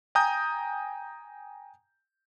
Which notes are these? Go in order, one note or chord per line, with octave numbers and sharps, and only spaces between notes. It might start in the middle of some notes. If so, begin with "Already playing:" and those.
G5 G#5 A#5 D#6 G6